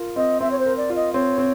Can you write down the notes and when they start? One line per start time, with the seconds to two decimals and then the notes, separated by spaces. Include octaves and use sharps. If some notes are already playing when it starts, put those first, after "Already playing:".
Already playing: F4 A#4
0.16 C4 D#5
0.41 C4 E5
0.51 C#5
0.59 C5
0.66 A#4
0.77 D5
0.90 F4
0.96 D#5
1.14 C4 C#5
1.38 C4